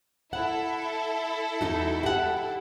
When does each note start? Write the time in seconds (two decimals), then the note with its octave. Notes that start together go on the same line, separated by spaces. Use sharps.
0.33 E4 A4 F#5
1.61 E2 D#4 F#4
2.03 G4 F#5